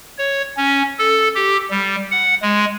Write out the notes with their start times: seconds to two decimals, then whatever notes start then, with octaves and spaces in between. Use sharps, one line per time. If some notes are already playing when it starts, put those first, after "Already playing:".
0.18 C#5
0.57 C#4
0.99 A4
1.35 G4
1.70 G3
2.11 F#5
2.42 G#3